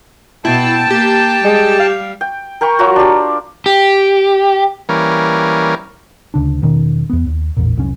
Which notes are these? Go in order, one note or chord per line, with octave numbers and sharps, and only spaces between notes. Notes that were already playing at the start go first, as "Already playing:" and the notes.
B2 E4 G5 A5
A#3 G4
G3 G#3
F5
G5
A#4 G5 B5 C#6
F#3 F4 F#4
D4 G4
G4
E3 G3 A#3 C#4 A#4
D2 C#3 D4
E1 B2 D#3 C#4
E2 B3
D#2
A1 E2 A#2
F1 C2 F#3 C#4